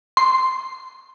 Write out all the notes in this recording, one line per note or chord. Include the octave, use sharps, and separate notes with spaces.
C6